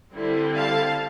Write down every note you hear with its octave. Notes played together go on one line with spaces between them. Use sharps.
D3 G3 C4 E4
F5 A5